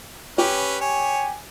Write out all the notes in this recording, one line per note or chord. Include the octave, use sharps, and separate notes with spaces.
C#4 G4 B4
C#5 G#5